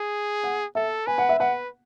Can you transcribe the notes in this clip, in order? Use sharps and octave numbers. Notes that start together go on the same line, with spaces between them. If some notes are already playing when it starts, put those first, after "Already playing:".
Already playing: G#4
F#5
A4 E5
B4 G#5
F#5
E5
B4 F#5